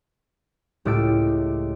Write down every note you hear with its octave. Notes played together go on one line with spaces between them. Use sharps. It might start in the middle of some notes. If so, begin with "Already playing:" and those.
C#2 A2 G4 E6 A6 D7